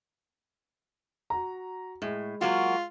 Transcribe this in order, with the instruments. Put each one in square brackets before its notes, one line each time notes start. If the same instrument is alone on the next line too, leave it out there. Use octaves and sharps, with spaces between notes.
[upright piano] F#4 A#5
[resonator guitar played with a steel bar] A2 [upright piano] G#3
[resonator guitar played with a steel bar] F#3 A#3 F#4 [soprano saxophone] F4